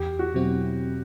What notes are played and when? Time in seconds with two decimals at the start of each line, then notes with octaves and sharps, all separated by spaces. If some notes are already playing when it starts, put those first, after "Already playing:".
Already playing: E2 G4
0.19 F#4
0.34 B2 F#3 C4 E4